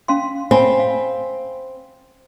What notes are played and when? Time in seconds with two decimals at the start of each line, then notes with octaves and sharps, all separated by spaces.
0.08 C#4 F5 C6
0.51 C4 F5 G#5 B5
0.80 F5